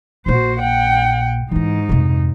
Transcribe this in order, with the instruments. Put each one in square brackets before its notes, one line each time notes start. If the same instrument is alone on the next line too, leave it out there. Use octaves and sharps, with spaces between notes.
[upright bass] A#1 A#2 [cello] F#4 C5
[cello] F#5 G5
[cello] G#2 D#4 [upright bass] E3 E4
[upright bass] F2 C3